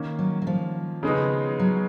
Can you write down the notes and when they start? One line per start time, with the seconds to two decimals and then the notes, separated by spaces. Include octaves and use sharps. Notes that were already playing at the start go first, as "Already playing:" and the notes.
Already playing: D#3 A#3 C#4
0.19 F#3
0.42 F#3
0.47 F3
1.03 C#3 G#3 B3 D#4
1.59 F#3